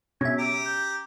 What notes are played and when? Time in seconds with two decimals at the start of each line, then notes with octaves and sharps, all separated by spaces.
0.21 B2 C#4 E5 G#6
0.38 G4 A#5 D7
0.65 G6